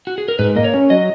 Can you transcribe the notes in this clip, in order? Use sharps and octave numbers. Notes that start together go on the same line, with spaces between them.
F#4
G#4
A#4
G#2 B4
A#3 D#5
C#5
C#4
F#3 D#5